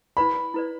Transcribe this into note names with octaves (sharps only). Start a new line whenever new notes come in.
E4 B4 D5 B5
E4 B4 D5